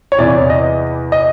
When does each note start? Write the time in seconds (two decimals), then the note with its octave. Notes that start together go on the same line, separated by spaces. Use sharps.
0.12 C#5
0.19 E2 C3 E3 D5
0.50 D#5
1.12 D#5